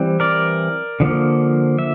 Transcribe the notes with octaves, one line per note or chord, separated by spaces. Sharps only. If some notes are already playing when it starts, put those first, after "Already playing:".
Already playing: E3 G3 C4
A#4 D5
D3 F3 A#3
E5